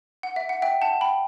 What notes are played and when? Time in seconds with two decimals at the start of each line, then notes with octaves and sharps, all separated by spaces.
0.23 F#5
0.36 E5
0.49 F#5
0.62 E5 G5
0.82 F#5 A5
1.01 G5 B5